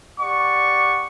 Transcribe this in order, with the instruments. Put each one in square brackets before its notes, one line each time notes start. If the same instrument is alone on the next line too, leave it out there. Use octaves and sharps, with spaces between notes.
[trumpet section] G4 D5 F#5 C#6